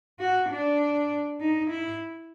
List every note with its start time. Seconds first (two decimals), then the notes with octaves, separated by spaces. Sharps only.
0.20 F#4
0.50 D4
1.40 D#4
1.70 E4